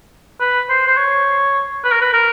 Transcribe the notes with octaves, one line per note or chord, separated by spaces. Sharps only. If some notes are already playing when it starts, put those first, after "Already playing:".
B4
C5
C5
C#5
B4
A#4
B4
A#4